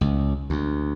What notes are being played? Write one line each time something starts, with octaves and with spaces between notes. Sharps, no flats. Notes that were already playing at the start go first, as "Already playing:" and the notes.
C#2
D2